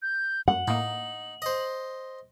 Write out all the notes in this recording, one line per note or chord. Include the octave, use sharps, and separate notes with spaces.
G6
F#2 F#5 F#7
A2 A#3 D#4
C5 D#5